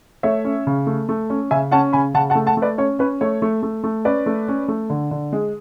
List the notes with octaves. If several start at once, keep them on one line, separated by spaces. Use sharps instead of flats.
A3 C#5 E5
C#4
C#3
A3
A3
C#4
C#3 E5 G#5
C#4 F#5 A5
C#3 G#5 B5
C#3 F#5 A5
F#5 A5
A3
F#5 A5
A3
B4 D5
C#4 C#5
C#4 B4
A3 C#5
A3
A3
A3
C#4 B4 D5
A3
C#4
A3
D3
D3
G#3